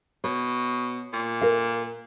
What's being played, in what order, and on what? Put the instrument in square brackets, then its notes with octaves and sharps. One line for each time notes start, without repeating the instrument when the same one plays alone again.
[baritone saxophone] B2 [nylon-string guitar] C#5
[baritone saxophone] A#2
[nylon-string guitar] A#4 F5